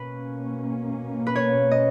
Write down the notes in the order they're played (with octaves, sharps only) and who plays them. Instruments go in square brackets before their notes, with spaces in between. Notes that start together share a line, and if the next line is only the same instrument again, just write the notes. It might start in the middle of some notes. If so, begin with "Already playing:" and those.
Already playing: [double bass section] B2 A#3 C#4 [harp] B4
[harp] B4
C#5
D#5